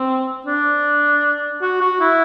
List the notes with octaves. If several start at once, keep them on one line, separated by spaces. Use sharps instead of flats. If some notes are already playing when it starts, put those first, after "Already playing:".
Already playing: C4
D4
F#4
F#4
E4